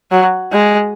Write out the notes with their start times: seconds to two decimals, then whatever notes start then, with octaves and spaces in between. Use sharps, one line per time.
0.11 F#3
0.52 G#3